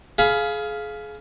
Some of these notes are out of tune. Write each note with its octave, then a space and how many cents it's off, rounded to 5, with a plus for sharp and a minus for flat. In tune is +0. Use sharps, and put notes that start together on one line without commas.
G#4 +30 F5 +0 B5 +0